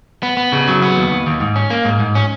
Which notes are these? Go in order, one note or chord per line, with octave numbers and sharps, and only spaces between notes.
B3
B3
C#3
F#3
B3
D#2
D#2
D#2
G#2
C#4
A#3
G#2
G#2
C#4